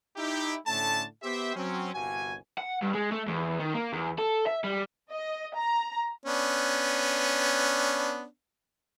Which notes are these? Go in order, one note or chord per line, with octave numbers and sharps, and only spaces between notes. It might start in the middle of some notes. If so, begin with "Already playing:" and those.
D#4 E4 G4
A2 D3 A3 C#4 A5
B3 G4 C5 E5
F#3 C4 C#4
G1 C2 G2 F#4 G#5
F#5
G2
G#3
A3
E2
D#3
A#3
E2
A4
E5
G3
D#5
A#5
B3 C#4 D4